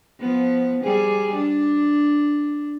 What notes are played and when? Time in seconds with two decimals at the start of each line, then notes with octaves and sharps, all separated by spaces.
0.20 F3 B3
0.84 G3 G#4
1.35 D4